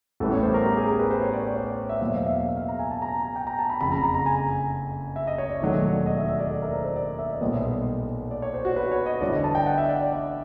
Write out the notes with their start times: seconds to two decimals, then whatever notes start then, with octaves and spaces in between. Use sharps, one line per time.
0.20 A1 A2 E3 G3 B3 A4
0.32 C#5
0.43 C5
0.54 A#4
0.66 G4
0.77 G#4
0.88 A#4
0.99 B4
1.11 C5
1.22 C#5
1.33 D5
1.45 D5
1.56 C#5
1.67 C5
1.89 E5
2.01 E2 B2 F#3 A#3 E5
2.15 F5
2.27 E5
2.31 F5
2.46 F5
2.57 F5
2.68 A#5
2.79 G#5
2.91 A5
3.02 A#5
3.25 G#5
3.36 G5
3.47 A#5
3.59 A5
3.70 B5
3.81 F#1 F2 C#3 B5
3.91 A#5
4.04 A#5
4.14 A#5
4.26 G#5
5.16 E5
5.27 D#5
5.38 C#5
5.50 D5
5.61 E1 D#2 D#3 F#3 A3
6.06 D#5
6.17 E5
6.29 E5
6.40 D5
6.51 A4
6.62 A#4
6.73 C5
6.85 C5
6.96 D5
7.19 E5
7.30 D#5
7.41 B1 A#2 G3 B3 D#5
8.31 D5
8.42 C#5
8.54 C5
8.65 F#4
8.76 B4
8.91 C#5
9.06 D#5
9.21 G1 G2 E3 D5
9.33 D#5
9.44 A5
9.55 G5
9.66 F#5
9.78 E5
9.89 D5
10.00 D5